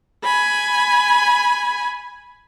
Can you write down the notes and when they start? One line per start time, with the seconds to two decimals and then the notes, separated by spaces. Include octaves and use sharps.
0.24 G#5 B5